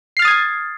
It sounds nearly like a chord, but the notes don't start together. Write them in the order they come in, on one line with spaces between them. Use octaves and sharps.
C7 F6 A6 D#6 G#6